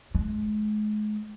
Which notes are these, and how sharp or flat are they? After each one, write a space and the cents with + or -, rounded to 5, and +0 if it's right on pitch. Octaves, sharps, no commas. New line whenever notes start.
G#3 +35